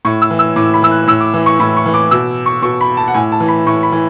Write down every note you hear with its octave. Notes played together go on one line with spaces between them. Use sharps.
A2 C#6
E6
E3
E6
A2 D6
B5
E3 E6
F#6
A2 E6
D6
E3
C#6
A2 B5
C#6
E3
D6
B2 E6
C#6
B2 C#6
B5
A5
F#5
A2 G#5
A5
E3
B5
A2 C#6
B5
E3